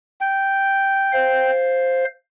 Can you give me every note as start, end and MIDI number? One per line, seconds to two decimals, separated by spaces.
0.21 1.51 79
1.12 2.04 72
1.12 2.04 77